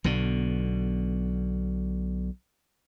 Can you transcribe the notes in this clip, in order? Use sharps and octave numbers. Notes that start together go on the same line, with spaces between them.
B1 B2 D3